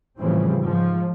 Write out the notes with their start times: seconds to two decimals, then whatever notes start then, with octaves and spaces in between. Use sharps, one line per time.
0.19 A2 C#3 E3 F3 G3 C4
0.58 G#2 F3